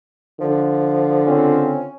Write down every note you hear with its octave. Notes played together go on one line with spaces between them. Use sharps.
D3 F3
C#3 C4 C#4 F4